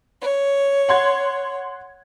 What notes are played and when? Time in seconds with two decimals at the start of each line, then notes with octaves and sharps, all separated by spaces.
0.20 C#5
0.89 F#5 C6 G#6